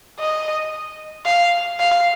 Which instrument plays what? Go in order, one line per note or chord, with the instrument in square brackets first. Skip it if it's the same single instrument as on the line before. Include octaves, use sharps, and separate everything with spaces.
[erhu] D#5
F5
F5